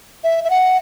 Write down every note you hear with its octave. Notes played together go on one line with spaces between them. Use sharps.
E5
E5
F#5